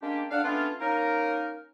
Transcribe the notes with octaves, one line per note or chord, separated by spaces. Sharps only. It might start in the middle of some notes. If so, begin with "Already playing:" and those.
G#3 A#3 C#4 D4 G4
D4 F5 F#5
A3 B3 C#4 D4 F4
A#3 C#4 D#4 A#4